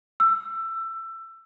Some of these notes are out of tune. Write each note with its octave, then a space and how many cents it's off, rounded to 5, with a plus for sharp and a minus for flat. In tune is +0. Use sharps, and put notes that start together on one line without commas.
E6 +20